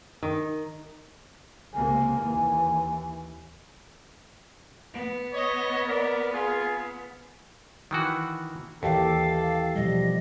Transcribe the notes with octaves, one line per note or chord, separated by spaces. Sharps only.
D#3
C#2 C3 A#3 G#5
D#2 E3
B3
C#5 D#5
A#4 D5
F4 G#4
D#3 E3 F#4
D#2 E3 G4 A4 E5 F5
B2 F3 G3 D#5